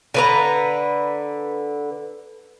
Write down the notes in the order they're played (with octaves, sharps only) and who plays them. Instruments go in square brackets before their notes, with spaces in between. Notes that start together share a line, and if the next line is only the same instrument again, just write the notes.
[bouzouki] D3 B4 A#5